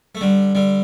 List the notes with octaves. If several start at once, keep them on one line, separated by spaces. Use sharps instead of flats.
A3
D3 G3
D3 G3